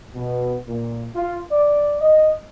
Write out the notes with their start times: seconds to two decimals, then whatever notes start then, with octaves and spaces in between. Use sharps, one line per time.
0.15 B2
0.67 A#2
1.15 F4
1.52 D5
2.01 D#5